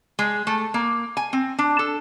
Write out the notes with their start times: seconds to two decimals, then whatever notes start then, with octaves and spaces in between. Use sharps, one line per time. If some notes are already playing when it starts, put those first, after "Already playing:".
0.19 G#3
0.47 A3
0.74 A#3
1.17 G#5
1.33 C4
1.59 D4
1.79 A4